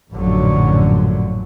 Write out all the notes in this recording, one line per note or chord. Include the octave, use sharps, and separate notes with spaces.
A1 F#2 A#2 D3 F3 F#3